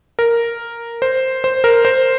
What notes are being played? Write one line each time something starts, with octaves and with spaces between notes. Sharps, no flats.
A#4
C5
C5
A#4
C5